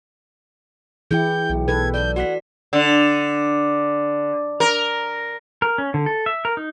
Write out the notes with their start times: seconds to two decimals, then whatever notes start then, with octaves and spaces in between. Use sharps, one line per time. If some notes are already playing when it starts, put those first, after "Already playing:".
1.11 E3 E4 G#4 G5 G6
1.49 B1
1.68 A4 B4 G#6
1.94 D5 G6
2.16 F#4 D5 F#5 B6
2.73 D3
4.60 A#4
5.62 A#4
5.78 C#4
5.94 D3
6.06 A4
6.26 E5
6.45 A#4
6.57 D#4